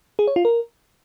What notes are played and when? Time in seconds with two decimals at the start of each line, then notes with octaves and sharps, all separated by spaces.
0.19 G#4
0.27 C#5
0.36 F4
0.45 A#4